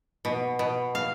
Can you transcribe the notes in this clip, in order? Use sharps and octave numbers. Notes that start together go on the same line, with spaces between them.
B2
B2
F5